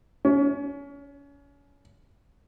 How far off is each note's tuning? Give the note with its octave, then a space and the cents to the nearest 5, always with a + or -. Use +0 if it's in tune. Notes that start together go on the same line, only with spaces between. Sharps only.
C#4 +30